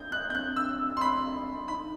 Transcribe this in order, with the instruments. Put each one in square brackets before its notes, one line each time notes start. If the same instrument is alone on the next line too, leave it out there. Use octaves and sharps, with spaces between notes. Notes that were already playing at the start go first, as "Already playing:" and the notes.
Already playing: [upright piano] G6
F#6
[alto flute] B3 [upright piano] G6
[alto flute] C4 [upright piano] F#6
[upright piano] E6
C6
B5
[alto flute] D#4 [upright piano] B5